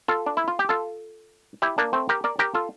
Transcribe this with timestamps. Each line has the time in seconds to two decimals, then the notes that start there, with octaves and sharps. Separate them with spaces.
0.08 F4 A4
0.26 D4
0.37 E4
0.48 F4
0.59 G4
0.69 F4 A4
1.62 E4 G4
1.78 A#3 D4
1.93 A3 C4
2.09 G4 A#4
2.24 A#4 D5
2.39 G4 A#4
2.54 F4 A4